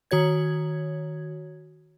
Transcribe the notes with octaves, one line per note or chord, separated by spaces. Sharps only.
D#3 F#4 C#5 G#6